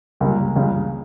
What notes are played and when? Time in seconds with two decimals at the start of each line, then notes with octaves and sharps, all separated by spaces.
0.20 C#2 C#3 G3 A#3
0.55 C#2 C#3 G3